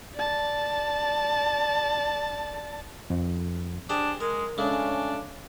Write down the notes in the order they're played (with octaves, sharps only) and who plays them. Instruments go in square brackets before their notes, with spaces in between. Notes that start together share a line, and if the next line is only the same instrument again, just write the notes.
[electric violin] D5 A5
[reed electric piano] F2
[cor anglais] D4 [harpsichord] G4 G#4 C5
[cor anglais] G#3 [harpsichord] A#4
[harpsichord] C#3 G#3 A3 [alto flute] C#4 [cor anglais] D4